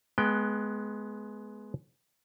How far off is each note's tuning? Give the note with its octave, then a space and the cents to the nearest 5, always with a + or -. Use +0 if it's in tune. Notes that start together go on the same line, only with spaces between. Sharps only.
G#3 +20 B3 +0 G5 +0